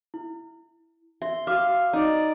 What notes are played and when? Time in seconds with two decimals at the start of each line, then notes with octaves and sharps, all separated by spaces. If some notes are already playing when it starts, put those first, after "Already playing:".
0.14 E4
1.22 E5 C6
1.47 F#4 E5 F5 D6 F6
1.93 D#4 D5